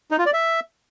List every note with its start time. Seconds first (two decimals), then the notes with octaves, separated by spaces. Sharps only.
0.11 D#4
0.19 F4
0.26 D5
0.33 E5